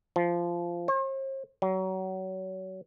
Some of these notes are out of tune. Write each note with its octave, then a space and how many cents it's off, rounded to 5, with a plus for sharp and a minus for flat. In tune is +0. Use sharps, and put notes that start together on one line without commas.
F3 -15
C5 +45
F#3 +30